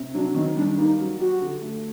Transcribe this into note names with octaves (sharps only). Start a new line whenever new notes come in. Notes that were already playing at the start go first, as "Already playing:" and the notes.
Already playing: C3
F#3 D4
D#3 C4
G3 D4
A#3 D#4
F#3
F#4 G4
D3
A3